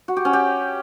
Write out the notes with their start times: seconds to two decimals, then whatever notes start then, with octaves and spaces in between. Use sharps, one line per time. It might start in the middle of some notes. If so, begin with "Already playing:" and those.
0.08 F#4
0.17 G4
0.25 C#4
0.33 G4